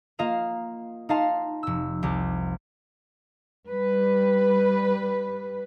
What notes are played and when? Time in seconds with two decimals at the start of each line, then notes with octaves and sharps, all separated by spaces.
0.19 A#3 F4 D#5 F5
1.09 D#4 D#5 F5 A5 C6
1.63 F1 E6
2.03 C2 G4
3.67 G3 B4